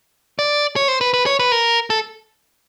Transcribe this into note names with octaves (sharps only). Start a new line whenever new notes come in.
D5
C#5
C5
B4
B4
C#5
B4
A#4
A4